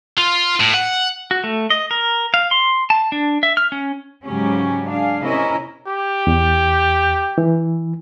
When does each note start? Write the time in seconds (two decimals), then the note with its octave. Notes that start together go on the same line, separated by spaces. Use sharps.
0.18 F4
0.60 A2
0.74 F#5
1.31 F#4
1.44 A3
1.70 D#5
1.91 A#4
2.34 F5
2.51 C6
2.90 A5
3.12 D4
3.43 E5
3.57 F6
3.72 C#4
4.24 G#2 C#3 F#3 C#4 G4 G#4
4.88 D4 G#4 F5
5.22 C3 C#4 E4 A#4 D#5 E5
5.87 G4
6.27 E2
7.38 E3